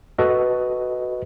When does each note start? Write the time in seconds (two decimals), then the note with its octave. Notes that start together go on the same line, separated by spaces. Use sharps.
0.18 F#4 A4 B4 D#5